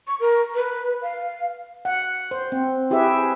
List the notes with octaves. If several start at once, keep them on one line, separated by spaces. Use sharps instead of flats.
C#6
A#4
B4
F5
F#5
C5
C4
E4 G4 G#4 B4 E5